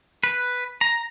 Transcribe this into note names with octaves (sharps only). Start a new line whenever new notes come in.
B4
A#5